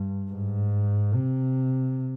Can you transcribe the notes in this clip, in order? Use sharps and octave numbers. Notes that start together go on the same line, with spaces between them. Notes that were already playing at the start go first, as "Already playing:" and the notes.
Already playing: G2
G#2
C3